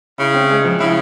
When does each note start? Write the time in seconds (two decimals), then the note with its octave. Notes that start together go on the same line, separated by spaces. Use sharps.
0.18 C#3 E4
0.34 C4
0.50 G#3
0.64 F3
0.80 C#3 E4